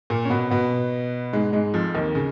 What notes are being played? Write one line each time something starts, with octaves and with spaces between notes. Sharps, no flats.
A#2 A#3
C#4
B2 B3
B2 B3
G#2 G#3
G#2 G#3
F2 F3
D#2 D#3
C#3